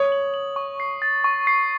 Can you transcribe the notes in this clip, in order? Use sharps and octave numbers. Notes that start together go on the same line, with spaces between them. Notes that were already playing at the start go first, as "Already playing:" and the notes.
Already playing: C#5 D#6
F#7
F#7
C#6
C7
A6
C#6
C7